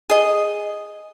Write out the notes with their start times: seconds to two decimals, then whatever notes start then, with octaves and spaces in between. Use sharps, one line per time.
0.10 G#4 D#5